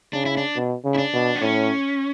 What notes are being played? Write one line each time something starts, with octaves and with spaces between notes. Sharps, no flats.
C#3 D4
E4
D4
B2
C#3
E4
D4
B2
B3
A2 C#4